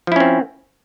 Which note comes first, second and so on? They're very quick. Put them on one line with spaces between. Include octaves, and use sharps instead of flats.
F3 E4 C#4 C4